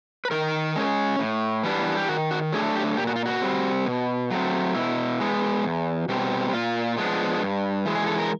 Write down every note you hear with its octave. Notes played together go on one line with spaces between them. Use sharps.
B4
D#3 A#4
G#3 C#4
A2
E3 G3 B3 D4
G4
D#3 F#4
F#4
F#3 A3 D4 G#4
G4
A#2 G4
F#4
F4
F#4
G3 C4
B2
F#3 A3 C4
B2 E4
G#3 B3
E2
B2 G3 C4
A#2 F4
F3 G#3 B3 D4
G2
E3 G#3
G#4
A4
A#4